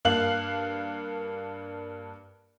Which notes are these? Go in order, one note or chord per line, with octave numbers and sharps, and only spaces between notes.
G2 A#3 D4 F5 F#6 F#7